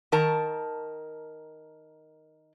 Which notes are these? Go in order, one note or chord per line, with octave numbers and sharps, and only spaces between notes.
D#3 A#4 A5